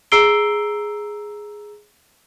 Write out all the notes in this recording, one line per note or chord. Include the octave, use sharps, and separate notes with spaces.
G#4 A#5 E6 C7 D7 G7